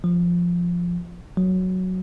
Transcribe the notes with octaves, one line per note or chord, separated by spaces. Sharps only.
F3
F#3